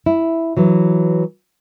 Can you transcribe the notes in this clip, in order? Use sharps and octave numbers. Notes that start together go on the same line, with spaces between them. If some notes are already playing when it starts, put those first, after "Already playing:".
E4
E3 F#3